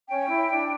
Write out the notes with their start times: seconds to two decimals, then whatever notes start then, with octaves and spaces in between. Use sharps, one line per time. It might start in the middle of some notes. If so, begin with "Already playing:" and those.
0.07 C#4 G5
0.28 E4
0.49 D4